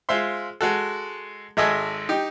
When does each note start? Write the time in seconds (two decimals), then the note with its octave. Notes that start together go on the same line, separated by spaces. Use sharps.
0.09 G#3 F4 C5 E5 C6
0.61 G#3 F#4 A4
1.57 G#1 G#3 A4 D#5 E5 G#5
2.09 D#4 G4